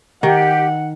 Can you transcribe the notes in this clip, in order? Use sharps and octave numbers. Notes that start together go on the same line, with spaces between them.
D#3 G4 F#5